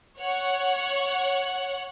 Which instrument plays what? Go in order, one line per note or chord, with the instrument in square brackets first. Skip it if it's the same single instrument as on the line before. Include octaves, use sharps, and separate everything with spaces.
[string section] C#5 F#5 F#6